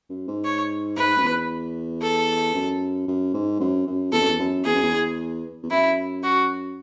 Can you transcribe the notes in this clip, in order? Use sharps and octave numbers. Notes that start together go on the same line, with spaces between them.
F#2
G#2
C#5
G#2 B4
F#2
E2
A4
F#2
F#2
G#2
F#2
F#2
E2 A4
F#2
E2
F#2
E2 G#4
F#2
E2
E2
F#2 E4
F#4